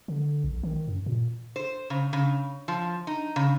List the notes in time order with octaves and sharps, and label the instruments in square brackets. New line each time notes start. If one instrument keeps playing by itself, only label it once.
[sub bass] D3
A#1
D#3
F#2
A#2
[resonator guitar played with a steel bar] C5
C#3
C#3
F3
D#4
C#3